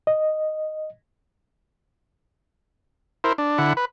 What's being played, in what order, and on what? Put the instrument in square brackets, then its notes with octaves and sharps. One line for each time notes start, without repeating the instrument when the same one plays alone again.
[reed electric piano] D#5
[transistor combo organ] E4 A#4 C5
D4
D3 E4 F#5
B4